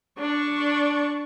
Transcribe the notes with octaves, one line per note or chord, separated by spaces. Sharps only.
D4 C#6